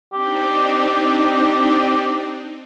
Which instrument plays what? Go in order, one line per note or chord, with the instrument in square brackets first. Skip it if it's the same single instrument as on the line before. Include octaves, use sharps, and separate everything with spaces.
[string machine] C4 D4 D#4 [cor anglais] G4